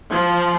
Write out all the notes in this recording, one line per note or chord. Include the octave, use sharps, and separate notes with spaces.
F3